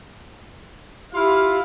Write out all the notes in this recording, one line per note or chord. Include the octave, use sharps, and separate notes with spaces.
E4 F4 G4 F5